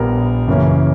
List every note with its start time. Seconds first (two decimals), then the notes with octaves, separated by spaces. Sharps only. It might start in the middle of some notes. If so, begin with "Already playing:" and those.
Already playing: A#1 A#2 G3 B3 A#4
0.48 F#2 C#3 E3 A#3 C#4